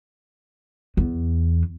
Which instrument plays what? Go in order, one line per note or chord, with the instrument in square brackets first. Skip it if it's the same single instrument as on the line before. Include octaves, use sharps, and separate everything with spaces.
[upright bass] E2